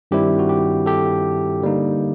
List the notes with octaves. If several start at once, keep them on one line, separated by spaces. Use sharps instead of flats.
G2 D#3 G3 C4 E4 G4
F#4
G4
G4 A4
D3 G3 A#3 D#4